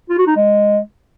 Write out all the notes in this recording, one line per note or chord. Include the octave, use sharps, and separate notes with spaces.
F4
F#4
D#4
G#3